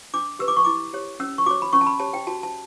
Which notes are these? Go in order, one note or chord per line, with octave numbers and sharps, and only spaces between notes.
D4 D6
G4 B4 E6
D6
C#6
E4 D6
G4 C#5
C#4 E6
C#6
F#4 C#5 D6
B5
C#4 C#6
A5
B5
G4 C#5 A5
G5
F#4 A5
A5